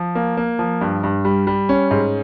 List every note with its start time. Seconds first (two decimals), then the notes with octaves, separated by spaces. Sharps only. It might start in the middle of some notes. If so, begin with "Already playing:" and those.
Already playing: F3
0.15 A#3
0.37 A#3
0.59 F3
0.81 G2
1.04 G2
1.25 G3
1.47 G3
1.69 C#4
1.91 G#2